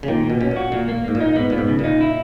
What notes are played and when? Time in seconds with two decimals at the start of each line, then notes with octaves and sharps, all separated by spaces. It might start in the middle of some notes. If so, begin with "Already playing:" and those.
0.03 C#3
0.08 A#2 D#3
0.24 A#2
0.30 B2
0.40 B2 C#4
0.51 A#2
0.56 F#4
0.72 A#2 A#3
0.89 A#3
1.05 G#2 A#3
1.15 A#2
1.20 D#4
1.36 G#2 B3
1.50 A#2 B3
1.58 G#2
1.68 C#3
1.79 A#2 D#4
2.01 E4